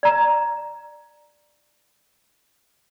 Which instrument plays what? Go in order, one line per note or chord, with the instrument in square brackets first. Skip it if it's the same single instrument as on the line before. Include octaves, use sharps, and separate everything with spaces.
[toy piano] D5 A#5